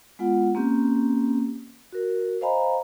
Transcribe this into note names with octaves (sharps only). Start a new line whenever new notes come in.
G#3 B3 F4 F#5
A#3 C4 C#4 G4
F#4 A#4
C5 D#5 F5 G#5 A#5 B5